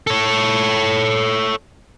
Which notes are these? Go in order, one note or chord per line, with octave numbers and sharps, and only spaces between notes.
A4 C#5